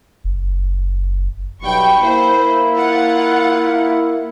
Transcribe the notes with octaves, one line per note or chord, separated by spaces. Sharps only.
F#1
B1 G3 G5 B5 C#6
A#3 E4 C5
F4 F#5
F5